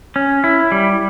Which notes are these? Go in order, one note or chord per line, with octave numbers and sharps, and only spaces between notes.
C#4
E4
G3